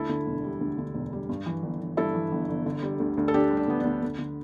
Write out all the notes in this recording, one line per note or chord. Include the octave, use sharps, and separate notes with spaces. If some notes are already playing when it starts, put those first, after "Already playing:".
Already playing: D2 E4 A4
D3
E1
G3
D2
D3
E1
G3
G2
E3
G1
G1
G2 E4 A4
E3
G1
G1
D3
G3
D2
D2
A4
D3 D4 G4
G3
D4
D2 B3
D4
D2
D2
D3